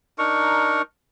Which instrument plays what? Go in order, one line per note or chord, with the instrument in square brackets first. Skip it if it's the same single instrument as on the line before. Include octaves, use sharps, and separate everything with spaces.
[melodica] D4 D#4 A#4 C#6